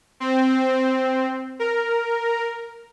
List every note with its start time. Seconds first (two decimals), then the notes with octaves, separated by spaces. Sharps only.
0.20 C4
1.59 A#4